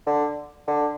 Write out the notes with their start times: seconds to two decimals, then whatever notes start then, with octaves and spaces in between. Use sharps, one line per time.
0.07 D3
0.68 D3